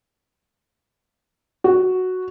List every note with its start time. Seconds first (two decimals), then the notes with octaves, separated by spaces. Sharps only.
1.64 F#4